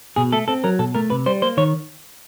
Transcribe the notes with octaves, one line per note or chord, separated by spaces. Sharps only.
B2 G#4
A3 A4
C4 A4
F#3 A#4
B2 A4
A3 A#4
C3 B4
G3 C5
A#3 C5
D#3 C#5